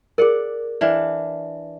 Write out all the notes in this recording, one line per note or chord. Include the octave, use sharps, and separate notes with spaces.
G#4 A#4 D5 F#5
E3 D4 F5